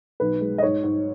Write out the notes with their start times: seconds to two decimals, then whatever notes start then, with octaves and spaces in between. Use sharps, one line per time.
0.20 B1 B4
0.41 G#3
0.58 D#5
0.62 G#2 C#5
0.83 G#2